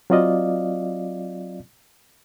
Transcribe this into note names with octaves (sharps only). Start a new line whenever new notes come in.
F#3 C4 F4 D5 D#5 F5